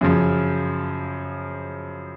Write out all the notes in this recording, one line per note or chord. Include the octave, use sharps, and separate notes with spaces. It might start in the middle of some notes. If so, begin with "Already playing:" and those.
F#2 C#3 F3